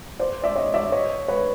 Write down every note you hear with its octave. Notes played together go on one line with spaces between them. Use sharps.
C5 D5
D5 E5
C#5 D#5
D5 E5
C#5 D#5
B4 C#5